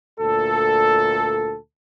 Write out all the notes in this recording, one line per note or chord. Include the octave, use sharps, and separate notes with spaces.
D2 A#2 A4